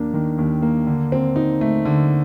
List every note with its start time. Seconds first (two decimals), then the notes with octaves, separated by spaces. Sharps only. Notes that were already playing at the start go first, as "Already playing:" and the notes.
Already playing: D#2 A#3 D4
0.14 D#3
0.38 D#2
0.62 A#3
0.87 D3
1.12 C4
1.36 D#4
1.61 A3
1.85 D3